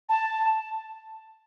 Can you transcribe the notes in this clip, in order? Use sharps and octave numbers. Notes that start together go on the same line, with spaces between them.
A5